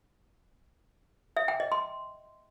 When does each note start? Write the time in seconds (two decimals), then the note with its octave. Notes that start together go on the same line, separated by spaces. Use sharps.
1.37 E5
1.48 G5
1.60 D#5
1.72 C6